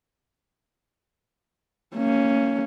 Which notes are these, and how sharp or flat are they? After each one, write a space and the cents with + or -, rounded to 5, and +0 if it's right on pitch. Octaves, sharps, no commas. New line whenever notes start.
A#3 -30 C#4 +0